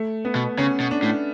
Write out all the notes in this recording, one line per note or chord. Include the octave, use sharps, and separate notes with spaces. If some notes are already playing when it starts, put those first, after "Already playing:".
Already playing: A3
B3
B2
C#3 C#4
B2
D4
A2